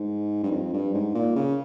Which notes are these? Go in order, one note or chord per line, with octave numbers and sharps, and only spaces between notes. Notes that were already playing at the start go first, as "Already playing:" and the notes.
Already playing: G#2
G2
F2
G2
G#2
A#2
C#3